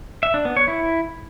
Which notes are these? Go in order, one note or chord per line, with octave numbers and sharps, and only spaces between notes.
E5
D4
B3
C#5
E4